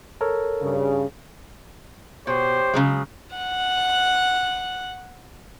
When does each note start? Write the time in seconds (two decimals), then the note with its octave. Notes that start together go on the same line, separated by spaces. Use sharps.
0.21 A4 A#4 C#5
0.61 G2 C#3
2.27 B2 G4 C5 C#5
2.74 C#3 F#3 G#3
3.36 F#5 F#6